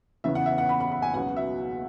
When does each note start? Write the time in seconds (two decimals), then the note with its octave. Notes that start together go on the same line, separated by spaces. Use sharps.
0.24 E2 C#3 E3 B3 E5
0.35 F#5
0.46 E5
0.58 F#5
0.69 B5
0.80 B5
0.92 B5
1.02 G#5
1.14 C#2 B2 F#3 B3 F#5
1.36 E5